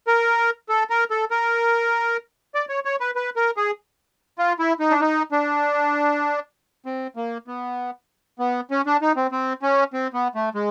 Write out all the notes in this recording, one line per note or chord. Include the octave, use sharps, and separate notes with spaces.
A#4
A4
A#4
A4
A#4
D5
C#5
C#5
B4
B4
A#4
G#4
F4
E4
D#4
D4
D#4
D4
C4
A#3
B3
B3
C#4
D4
D#4
C4
C4
C#4
C4
B3
A3
G#3